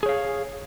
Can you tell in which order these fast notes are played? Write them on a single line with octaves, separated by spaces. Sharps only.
G#4 C#5 F5